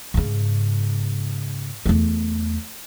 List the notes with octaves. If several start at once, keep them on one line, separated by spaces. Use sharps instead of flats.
G#2 C#3
E2 A3